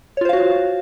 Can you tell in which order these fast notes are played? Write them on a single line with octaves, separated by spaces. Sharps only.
C#5 F4 C5 F5 F#4